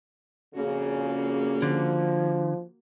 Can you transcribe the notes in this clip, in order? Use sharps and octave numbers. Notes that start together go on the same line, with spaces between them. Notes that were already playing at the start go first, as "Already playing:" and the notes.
F2 A#2 C#3 A#3 F#4
D3 F3